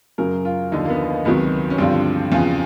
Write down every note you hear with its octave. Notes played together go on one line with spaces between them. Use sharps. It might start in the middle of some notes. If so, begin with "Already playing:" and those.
F#2 C#3 F#3 A#4
F4
D#2 D3 F3 D#4
A#3
B3
A#3
C#2 C3 D#3 F#3 B3
C#4
G2 D3 F3 C4
E2 C#3 F3